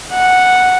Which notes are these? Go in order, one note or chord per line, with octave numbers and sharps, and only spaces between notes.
F#5